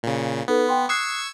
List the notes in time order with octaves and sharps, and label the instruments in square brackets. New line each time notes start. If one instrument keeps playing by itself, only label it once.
[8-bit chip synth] A#2 C#3
[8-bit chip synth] B3 [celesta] D#4 A4 B4
[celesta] G5 C6
[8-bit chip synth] C#6 E6 G#6 [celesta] D#6 F#6 C7